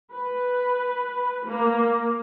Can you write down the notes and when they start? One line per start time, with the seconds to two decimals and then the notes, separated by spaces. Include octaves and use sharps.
0.12 B4
1.46 A#3